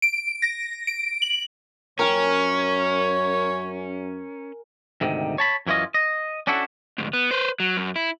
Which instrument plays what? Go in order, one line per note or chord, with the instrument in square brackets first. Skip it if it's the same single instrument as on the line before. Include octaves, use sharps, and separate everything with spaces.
[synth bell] D7
A#6
D7
F#7
[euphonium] F#2 [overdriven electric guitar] C#4 [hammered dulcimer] A#4 G#5 [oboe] C#5
[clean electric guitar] D2 G#2 C3 D#3
C#5 A5 B5
F#2 E3 C#4 F4 D#5
D#5
C#4 D4 E4 F#4 A4
[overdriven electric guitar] D2 G#2
B3
B4 C5
F#3
F#2
E4